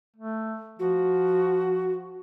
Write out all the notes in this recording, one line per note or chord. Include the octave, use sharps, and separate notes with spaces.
A3
F3 F#4